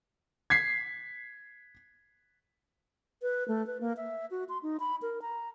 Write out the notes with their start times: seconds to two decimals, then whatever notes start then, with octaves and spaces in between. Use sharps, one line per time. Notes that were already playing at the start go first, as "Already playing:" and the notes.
0.50 G#6 B6 C7
3.22 B4
3.48 A3
3.67 B4
3.81 A#3
3.97 E5
4.31 F#4
4.49 C6
4.63 D#4
4.80 B5
5.02 A#4
5.22 A#5